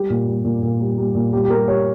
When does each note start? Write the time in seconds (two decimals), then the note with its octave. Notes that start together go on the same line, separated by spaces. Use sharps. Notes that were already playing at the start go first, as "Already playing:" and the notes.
Already playing: G3 G4
0.10 A#2
0.27 G3
0.45 A#2
0.63 A#2
0.80 G3
0.98 G3
1.15 A#2
1.33 G3 G4
1.44 G4
1.50 G3 A#4
1.68 G3 C#5